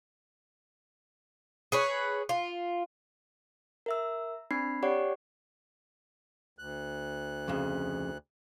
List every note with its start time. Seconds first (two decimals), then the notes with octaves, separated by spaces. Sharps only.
1.72 G#4 B4 C#5
2.29 F4
3.86 A#4 E5 E6
4.51 C4 D4 B5 C7
4.83 G4 C#5 D5 F#5 C#6
6.59 D2 F#6
7.48 F2 C#3